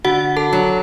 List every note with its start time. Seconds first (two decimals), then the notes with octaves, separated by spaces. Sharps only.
0.04 D3 F#4 F#5
0.37 A4 A5
0.53 F#3